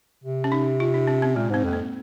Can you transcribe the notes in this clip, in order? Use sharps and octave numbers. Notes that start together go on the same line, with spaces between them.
C3
C#4
D#4
F4
D#4
C#4
C4
A#2 G#3
G#2 C4
F2 A#3
C4